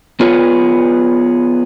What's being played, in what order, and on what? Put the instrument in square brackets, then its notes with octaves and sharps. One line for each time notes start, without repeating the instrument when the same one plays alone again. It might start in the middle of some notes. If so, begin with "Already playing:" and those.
[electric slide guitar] B3 F4 G#4 B4 C#5